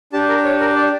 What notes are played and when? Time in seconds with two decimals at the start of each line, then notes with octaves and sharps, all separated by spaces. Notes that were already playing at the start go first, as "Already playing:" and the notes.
0.13 D4 G4 A5
0.29 A#4
0.44 C#5
0.61 A#4
0.76 D5